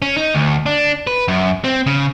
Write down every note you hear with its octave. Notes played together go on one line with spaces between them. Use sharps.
C#4
D#4
D2
D4
B4
F#2
C4
C#3